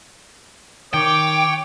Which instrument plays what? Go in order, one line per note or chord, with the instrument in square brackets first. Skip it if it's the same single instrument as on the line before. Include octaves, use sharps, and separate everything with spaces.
[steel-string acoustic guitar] D#3 [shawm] C#5 [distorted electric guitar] G5 [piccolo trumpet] D6